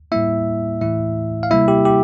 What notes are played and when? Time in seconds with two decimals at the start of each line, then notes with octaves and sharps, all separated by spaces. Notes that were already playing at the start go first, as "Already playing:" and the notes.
0.12 A2 G3 A#3 E4 E5
0.81 A2 E3 A3 E4 E5
1.43 F5
1.51 C3 G3 A#3 E4 E5
1.68 G4
1.85 G4